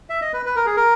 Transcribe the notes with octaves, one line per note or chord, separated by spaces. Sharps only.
E5
D#5
B4
B4
A#4
G#4
A#4